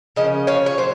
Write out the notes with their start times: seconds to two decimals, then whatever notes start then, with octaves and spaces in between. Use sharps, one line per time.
0.16 C#3 F3 A#3 C#4 D#5
0.47 C#5 F5
0.66 C#5
0.78 A#2 F#3 C5